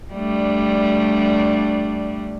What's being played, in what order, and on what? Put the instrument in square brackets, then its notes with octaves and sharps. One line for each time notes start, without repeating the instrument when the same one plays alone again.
[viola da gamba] G3 A3 D4